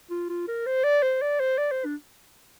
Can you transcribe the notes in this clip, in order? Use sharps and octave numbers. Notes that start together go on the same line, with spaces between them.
F4
F4
A#4
C5
D5
C5
D5
C5
D5
C5
D4